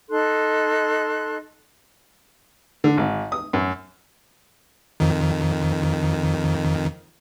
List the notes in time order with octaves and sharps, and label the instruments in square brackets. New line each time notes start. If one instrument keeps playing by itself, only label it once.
[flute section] D#4 A4 C6 F#6
[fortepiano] D3
G#1
D#6
F#2
[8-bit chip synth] F2 D#3